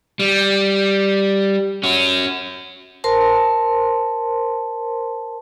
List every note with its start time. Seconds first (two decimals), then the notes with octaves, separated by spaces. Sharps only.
0.19 G3
1.83 C#4 F#4
3.04 A#4 C5 A5 C6